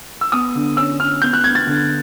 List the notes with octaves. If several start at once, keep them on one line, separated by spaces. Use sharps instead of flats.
E6
B3 D#6
D3
C#4 E6
C#4 F6
B3 G6
F#6
B3 G#6
A6
D3